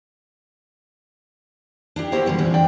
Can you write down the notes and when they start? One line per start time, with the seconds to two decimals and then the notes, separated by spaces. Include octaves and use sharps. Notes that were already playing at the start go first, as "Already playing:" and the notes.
1.96 D4 E4 G4
2.12 A#3 D4 E4 F#4 G4 C5
2.26 D3 E3 G3 G#3
2.39 A#2 E3 F3 C4 D4 E4
2.54 F2 D4 D5 G5